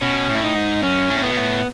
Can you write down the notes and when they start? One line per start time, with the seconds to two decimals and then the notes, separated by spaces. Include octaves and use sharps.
0.01 B2 C#4
0.29 A2
0.35 E4
0.43 D#4
0.55 G#2
0.83 F#2 C#4
1.10 A2
1.18 C#4
1.23 B3
1.31 B2
1.37 A2